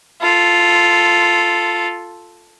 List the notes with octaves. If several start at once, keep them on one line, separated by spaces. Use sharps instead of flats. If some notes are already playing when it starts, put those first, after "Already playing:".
F4 A4